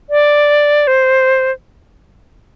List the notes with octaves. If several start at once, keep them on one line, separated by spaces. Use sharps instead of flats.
D5
C5